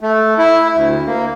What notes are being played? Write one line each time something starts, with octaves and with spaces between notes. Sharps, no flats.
A3
E4
D2
A#3